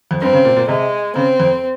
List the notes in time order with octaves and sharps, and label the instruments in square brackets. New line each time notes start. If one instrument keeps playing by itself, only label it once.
[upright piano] F2
[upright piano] G2 [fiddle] C4
[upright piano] C#3
A#2
A#2
[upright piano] C3 [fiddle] G#3
[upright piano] C#3 [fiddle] C4
[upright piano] F2